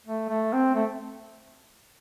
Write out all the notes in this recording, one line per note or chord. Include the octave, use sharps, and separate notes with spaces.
A3
A3
C4
A3